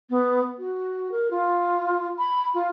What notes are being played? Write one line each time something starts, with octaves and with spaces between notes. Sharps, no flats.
B3
F#4
A#4
F4
B5
F4